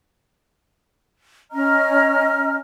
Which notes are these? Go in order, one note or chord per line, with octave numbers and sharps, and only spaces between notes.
C#4 D#5 A#5 F6